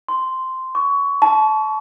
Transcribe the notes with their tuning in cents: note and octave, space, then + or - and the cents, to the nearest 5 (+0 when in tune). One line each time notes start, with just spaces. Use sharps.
C6 -5
C#6 +25
A5 -25